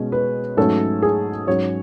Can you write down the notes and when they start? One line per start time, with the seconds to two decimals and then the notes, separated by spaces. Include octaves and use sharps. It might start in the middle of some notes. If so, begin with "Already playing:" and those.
Already playing: B2 G#3 C#4
0.12 B4
0.57 G#2 F#3 A3 C#4 A4
1.02 G#4
1.47 G#2 F#3 C#4 C#5